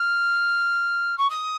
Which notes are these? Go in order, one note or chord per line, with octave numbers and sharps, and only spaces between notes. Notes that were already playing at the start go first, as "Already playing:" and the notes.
Already playing: F6
C#6
D#6